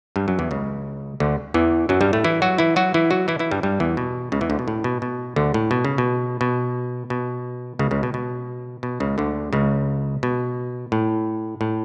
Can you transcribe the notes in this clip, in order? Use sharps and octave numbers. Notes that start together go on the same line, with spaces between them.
G2 G3
F#2 F#3
E2 E3
C#2 C#3
D2 D3
E2 E3
F#2 F#3
G2 G3
A2 A3
E3 E4
F#3 F#4
E3 E4
F#3 F#4
E3 E4
F#3 F#4
E3 E4
E3 E4
G2 G3
G2 G3
E2 E3
B2
C#2 C#3
E2 E3
D2 D3
B2
A2
B2
B2
D2 D3
A2
B2
C#3
B2
B2
B2
C#2 C#3
C#2 C#3
B2
B2
B2
C#2 C#3
D2 D3
C#2 C#3
B2
A2
A2